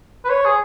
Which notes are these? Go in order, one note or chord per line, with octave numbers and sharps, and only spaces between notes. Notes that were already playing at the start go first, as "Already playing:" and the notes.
B4
C#5
G#4